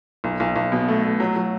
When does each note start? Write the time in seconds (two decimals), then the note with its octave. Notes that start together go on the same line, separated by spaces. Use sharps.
0.24 B1
0.40 B1
0.56 B1
0.72 B2
0.88 A3
1.04 A3
1.20 F#3
1.36 F#3